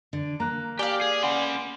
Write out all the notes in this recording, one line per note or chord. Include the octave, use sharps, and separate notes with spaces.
D3
A#3 A#5 F#6
G4 D5 F5 G#5
G#4
C#4 F#5 G#5 B5 C6